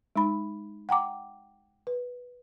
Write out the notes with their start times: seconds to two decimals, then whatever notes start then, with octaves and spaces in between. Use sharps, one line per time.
0.16 G#3 D#4 B5
0.89 F#5 G5 A#5 D6
1.87 B4